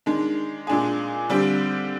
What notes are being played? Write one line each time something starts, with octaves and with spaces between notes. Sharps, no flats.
D#3 G#3 D4
A#2 G#3 D4 G#4
D3 G3 C4 G4